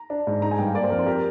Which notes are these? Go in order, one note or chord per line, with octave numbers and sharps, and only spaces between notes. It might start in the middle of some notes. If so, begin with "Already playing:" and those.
Already playing: A#5
D4
G#2
D#4 A#5
G#5
G2 G5
F5
A#3 D5
C5
F2 A#4
C5
G4 A#4